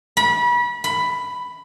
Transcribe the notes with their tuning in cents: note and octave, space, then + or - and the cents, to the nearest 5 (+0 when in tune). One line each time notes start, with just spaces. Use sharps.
B5 -30
B5 +10